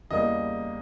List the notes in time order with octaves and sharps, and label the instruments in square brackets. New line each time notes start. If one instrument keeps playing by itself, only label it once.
[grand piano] E2 C#3 G3 A#3 D#5